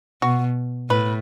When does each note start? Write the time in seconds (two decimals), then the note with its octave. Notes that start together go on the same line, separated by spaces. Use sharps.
0.22 B2 F#4
0.90 A2 B4